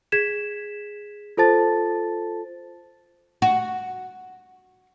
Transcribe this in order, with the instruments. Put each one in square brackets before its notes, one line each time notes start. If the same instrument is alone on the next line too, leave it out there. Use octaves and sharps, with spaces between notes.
[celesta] G#4 G#6 B6 E7
F4 A4 C5 A5 A6
[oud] F#4